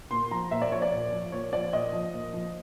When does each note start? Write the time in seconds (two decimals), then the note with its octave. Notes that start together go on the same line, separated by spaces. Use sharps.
0.11 A#2 C6
0.31 F3 A#5
0.51 A#2 E5
0.62 D5
0.71 F3 C#5
0.82 D5
0.92 A#2
1.12 F3
1.32 A#2 C#5
1.53 F3 D5
1.73 A#2 D#5
1.93 F3
2.13 A#2
2.33 F3